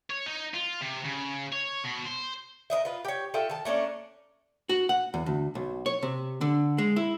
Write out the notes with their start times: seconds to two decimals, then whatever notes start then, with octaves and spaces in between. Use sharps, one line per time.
0.10 C#5
0.26 D#4
0.54 F4
0.81 C3
1.05 C#3
1.53 C#5
1.84 B2
2.06 C5
2.70 A#4 C5 D#5 E5
2.85 F4 B4
3.05 G4 C#5
3.34 F4 A4 E5 G5
3.50 D#3 A5
3.65 A3 A#3 C#4 D4
4.69 F#4
4.89 F#5
5.14 E2
5.26 D2
5.55 B1
5.86 C#5
6.03 C3
6.41 D3
6.78 G#3
6.96 E4